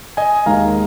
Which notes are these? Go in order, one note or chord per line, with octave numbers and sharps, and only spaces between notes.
D#5 G#5
D#2 D#3 G#3 F5 A#5